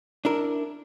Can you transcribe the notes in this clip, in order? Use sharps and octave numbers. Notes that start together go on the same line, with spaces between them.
D4 E4 A#4